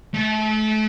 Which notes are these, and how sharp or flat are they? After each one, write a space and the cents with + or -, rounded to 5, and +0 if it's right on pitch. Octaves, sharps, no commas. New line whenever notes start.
A3 -30